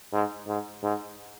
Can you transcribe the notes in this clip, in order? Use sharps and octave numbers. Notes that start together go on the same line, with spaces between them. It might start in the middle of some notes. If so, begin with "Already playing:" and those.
G#2
G#2
G#2